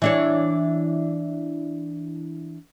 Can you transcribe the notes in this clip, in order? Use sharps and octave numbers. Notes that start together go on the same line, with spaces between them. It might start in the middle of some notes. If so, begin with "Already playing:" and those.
E3 D4 C#5